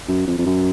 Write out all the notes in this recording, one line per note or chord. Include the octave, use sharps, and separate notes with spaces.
F#2
F2
F2
F#2